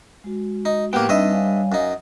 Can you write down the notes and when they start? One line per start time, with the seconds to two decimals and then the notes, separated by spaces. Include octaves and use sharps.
0.24 G#3 F#4
0.65 D#4
0.93 A2 A#3 B3 G4 G5
1.09 G2 G3 C4 D4 D#4 D#5 E5
1.31 C#5 F5 G#5
1.72 F#2 D#4